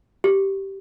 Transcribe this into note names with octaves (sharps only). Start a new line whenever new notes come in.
G4